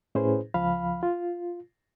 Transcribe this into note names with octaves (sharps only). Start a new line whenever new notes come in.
A2 C#4 E4 G#4 B4 C5
C#2 F3 F5 B5 F6
F4